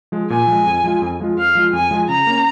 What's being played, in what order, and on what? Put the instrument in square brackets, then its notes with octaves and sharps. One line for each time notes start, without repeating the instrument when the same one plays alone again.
[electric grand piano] F3 G#3
[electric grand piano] A#2 [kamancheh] G#5
[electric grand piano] F3 G#3
F2
F3 G#3 F4
F2
F3 G#3 F4
[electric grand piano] F2 [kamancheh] F5
[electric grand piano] F3 G#3 F4
[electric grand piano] F2 [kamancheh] G#5
[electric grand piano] F3 G#3 F4
[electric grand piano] C#3 [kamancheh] A#5
[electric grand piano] A#3 C#4